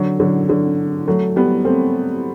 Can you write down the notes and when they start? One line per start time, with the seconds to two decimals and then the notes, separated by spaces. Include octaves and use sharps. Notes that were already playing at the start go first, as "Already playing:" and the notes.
Already playing: D3 F#3
0.20 D3 F#3
0.49 D3 F#3
1.07 F#3 A3
1.36 G3 B3
1.65 A3 C4